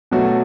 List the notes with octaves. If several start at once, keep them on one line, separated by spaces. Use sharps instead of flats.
B2 F#3 A3 F#4